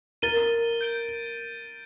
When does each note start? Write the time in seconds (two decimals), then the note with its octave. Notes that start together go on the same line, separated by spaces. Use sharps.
0.22 A#4 A6 D#7 G7
0.81 G6 D7 G7